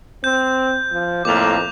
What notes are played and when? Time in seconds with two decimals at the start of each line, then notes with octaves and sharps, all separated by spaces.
0.24 C4 G6
0.93 F3
1.25 F2 A2 A#3 D6 F7